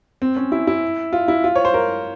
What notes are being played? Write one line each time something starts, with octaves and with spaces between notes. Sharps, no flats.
C4
C#4
E4
E4
F4
E4
F4
C#5
C5
A#4